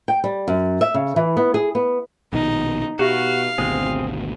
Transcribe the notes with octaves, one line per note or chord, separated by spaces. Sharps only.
G5
G3
F#2
E5
C#3
E3
B3
G#4
B3
A#1 B2 D#3 D#4
B2 F#4 G4 E5 F5
G#1 D2 B2 C4 G#4 C5